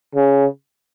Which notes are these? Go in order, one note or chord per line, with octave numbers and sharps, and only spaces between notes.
C#3